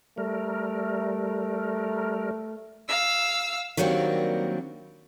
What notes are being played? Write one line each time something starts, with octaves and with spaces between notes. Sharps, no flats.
G3 A3 A#4
F5 E6
D#3 F#3 G3 A#3 C4 D4